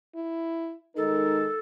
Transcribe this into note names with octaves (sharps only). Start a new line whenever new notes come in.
E4
D#3 G#3 D#4 A4 A#4